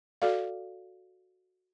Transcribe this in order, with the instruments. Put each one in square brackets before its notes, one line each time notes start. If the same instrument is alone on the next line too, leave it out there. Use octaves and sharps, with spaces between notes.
[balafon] F#4 A4 D5 F5